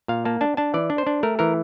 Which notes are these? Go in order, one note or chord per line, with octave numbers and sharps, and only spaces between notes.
A#2 F5
A#3 A5
D4 A5
D4 A5
E3 D5
D4
C5
D4
A3 A#4
E3 A#4